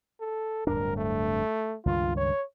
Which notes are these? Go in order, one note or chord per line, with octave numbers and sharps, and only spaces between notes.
A4
D1 G2 D4 A#4
A3
C#2 G2 D#3 F4
C#5